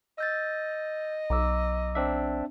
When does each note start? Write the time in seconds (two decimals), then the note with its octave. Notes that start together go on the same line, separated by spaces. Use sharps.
0.18 D#5 E6 G6 A6
1.30 B1 A#5 D6 E6
1.95 C4 D4 E5